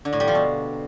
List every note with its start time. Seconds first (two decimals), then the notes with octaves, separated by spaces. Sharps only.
0.05 D3
0.13 A2
0.20 G3
0.28 F3
0.35 B2